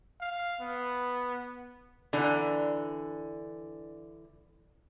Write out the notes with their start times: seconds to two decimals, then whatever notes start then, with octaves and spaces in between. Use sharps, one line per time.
0.21 F5
0.61 B3
2.13 D3 E3 D4 A#5